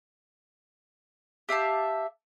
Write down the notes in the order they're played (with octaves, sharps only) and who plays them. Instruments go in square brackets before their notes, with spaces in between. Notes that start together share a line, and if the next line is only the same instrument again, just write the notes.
[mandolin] G4 E5 F5 A5